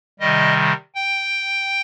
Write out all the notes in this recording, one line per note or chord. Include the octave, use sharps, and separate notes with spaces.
C3 D#3 G3 D#5
G5